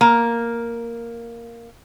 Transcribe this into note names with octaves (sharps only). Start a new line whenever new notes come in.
A#3 A#5